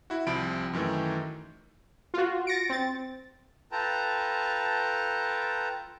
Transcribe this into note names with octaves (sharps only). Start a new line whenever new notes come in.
E4 F#4
C2 F3 C4 B5 D7
F#2 D#3 E3 A3
F4 F#4
A6 A#6 C#7 D7
C4 A6
F4 A4 B4 G5 A5 A#5